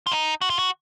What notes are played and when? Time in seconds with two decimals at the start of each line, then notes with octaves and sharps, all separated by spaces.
0.07 F4
0.11 D#4
0.41 F#4
0.50 F4
0.59 F#4